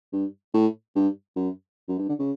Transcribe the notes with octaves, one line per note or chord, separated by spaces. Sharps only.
G2
A2
G2
F#2
F#2
G2
D3
C#3